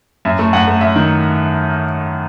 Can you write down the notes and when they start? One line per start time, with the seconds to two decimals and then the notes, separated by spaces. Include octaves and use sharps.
0.25 F#2 E5
0.39 A3
0.53 F#2 F#5
0.68 A3
0.81 F#2 E5
0.96 D#3